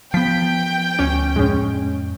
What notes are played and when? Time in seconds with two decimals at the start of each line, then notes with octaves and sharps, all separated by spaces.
0.14 F3 B3 G5 B6
0.99 D2 C#4
1.36 F2 A2 G#3 C#4